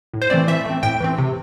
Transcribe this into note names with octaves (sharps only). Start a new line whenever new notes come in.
A2
C5
E3 A3 C4 D5
E3 E5
A3 C4
A2 G5
E3 A3 C4
C3